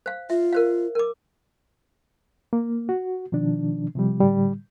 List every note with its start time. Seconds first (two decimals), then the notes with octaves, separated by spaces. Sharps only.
0.06 C5 F5
0.30 F4 E5
0.53 A#4 C5 F5
0.95 A#4 D6
2.53 A#3
2.89 F#4
3.32 B2 D#3 F3 D4
3.95 C3 F3 G3
4.20 A2 D3 G3